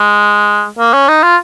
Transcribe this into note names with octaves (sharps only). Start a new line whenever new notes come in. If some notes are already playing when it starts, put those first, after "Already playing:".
Already playing: G#3
A#3
C#4
D#4
F4